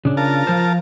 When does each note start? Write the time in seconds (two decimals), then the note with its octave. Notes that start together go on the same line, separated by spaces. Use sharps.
0.05 C#3 D4
0.17 F4 A#4 A5
0.47 F3 C5